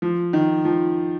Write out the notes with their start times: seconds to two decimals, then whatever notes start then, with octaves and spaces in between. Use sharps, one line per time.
0.02 F3
0.33 D#3
0.65 F3